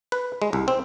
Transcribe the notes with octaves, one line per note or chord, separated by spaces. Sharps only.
B4
G#3
C2
C4